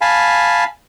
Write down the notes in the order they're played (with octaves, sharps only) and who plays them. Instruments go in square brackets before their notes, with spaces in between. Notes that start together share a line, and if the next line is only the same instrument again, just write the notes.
[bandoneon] F5 G#5 A5 B5